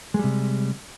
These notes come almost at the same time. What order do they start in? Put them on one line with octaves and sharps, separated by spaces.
G#3 G3 C3